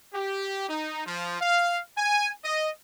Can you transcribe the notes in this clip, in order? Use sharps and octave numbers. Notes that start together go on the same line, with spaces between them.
G4
D#4
F3
F5
G#5
D#5